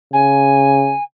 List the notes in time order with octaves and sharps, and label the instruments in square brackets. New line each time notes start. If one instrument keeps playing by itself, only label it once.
[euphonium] C#3 [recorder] G#5